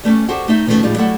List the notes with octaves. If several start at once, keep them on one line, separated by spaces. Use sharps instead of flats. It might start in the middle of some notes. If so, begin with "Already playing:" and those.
G3 A3 C4 C#4
F#4 G4 A4 C5 F#5
A3 D#4 E5
B2 D#3 F3 G#3 A3 C#4
A2 F3 G3 G#3 D#4 F4
F#3 G3 A3 E4 A4 F#5